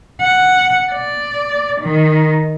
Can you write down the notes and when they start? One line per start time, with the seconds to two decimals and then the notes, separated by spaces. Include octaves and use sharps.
0.22 F#5
0.92 D5
1.80 D#3